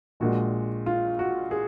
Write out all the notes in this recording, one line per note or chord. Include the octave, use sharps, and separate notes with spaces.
A#1 A#2 G#3 F#4
F4
F#4
G#4